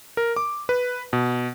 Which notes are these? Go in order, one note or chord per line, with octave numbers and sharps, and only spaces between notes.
A#4
D6
B4
B2